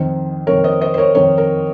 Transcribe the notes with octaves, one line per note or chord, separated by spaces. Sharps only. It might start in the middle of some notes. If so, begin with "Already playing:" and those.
Already playing: F2 D#3 C5
F2 D#3 A#4 C#5
C5 D#5
C5 D#5
C5
A#4 C#5
F2 D#3 A#4 C#5
A#4